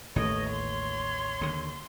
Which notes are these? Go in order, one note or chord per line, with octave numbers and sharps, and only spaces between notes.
A1 D#2 E3 A3 C#5 D#5
C6
D#2 D3